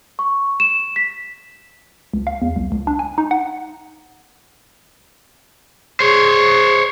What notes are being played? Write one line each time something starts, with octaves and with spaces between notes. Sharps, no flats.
C#6
E7
B6
C#2
F5
E2
C2
C#2
D4
G#5
D#4
F#5
G#4 C5 C#5